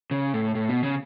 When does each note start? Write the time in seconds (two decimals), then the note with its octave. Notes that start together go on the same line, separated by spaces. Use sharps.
0.11 C#3
0.34 A2
0.55 A2
0.69 B2
0.83 C#3